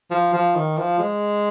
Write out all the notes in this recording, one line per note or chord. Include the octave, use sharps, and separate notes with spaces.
F3
F3
D#3
F3
G#3